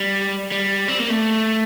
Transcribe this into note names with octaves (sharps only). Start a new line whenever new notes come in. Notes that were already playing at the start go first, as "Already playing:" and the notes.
Already playing: G3
G3
C4
A#3
A3